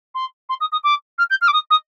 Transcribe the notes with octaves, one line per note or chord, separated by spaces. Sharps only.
C6
C6
D#6
D#6
D6
F6
G6
F6
D6
D#6
D#6